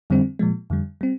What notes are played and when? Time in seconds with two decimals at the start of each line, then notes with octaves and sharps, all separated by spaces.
0.10 F2 D3 G3 C4
0.39 A#2 F3 G#3
0.70 F2 D3 G3
1.01 G3 C4